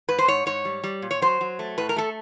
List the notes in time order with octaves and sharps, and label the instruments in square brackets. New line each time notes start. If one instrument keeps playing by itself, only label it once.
[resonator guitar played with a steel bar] G#2 B4
C5
G#2 C#5
G#2 C#5
G3
G3
A#2
C#5
F#3 C5
F#3
A3
A2 B4
A#4
A3 A4